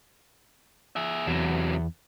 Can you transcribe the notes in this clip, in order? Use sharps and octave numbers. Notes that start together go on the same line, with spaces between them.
G#4 E5
E2 C3 F#3